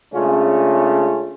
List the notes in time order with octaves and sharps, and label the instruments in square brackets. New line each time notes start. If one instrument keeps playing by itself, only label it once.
[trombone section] C#3 G#3 A3 C#4 D4 F4